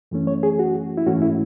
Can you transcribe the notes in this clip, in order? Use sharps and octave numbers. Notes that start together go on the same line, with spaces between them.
F#2 E3 A3 C#4
C#5
G#4
F#4
E4
G#2 E3 A3 C#4 F#4
E4